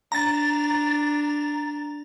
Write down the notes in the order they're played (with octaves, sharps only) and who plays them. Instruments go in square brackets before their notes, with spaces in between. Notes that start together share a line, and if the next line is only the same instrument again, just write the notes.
[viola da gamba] D4 [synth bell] A#5 A6